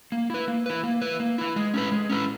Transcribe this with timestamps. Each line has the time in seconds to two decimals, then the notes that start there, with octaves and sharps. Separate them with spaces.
0.12 A#3
0.30 E4 B4
0.48 A#3
0.66 E4 B4
0.83 A#3
1.02 E4 B4
1.20 A#3
1.38 E4 B4
1.56 G#3
1.74 C#4 E4 B4
1.92 G#3
2.09 C#4 E4 B4